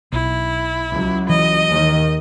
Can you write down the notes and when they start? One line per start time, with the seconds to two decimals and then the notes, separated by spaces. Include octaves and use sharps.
0.12 B1 E4
0.90 C#2 F#3
1.29 E3 D#5
1.67 D#2 D#3